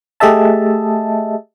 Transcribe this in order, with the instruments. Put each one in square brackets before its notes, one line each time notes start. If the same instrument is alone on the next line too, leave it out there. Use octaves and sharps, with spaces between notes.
[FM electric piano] A3 G4 G#4 D#5 E5 A5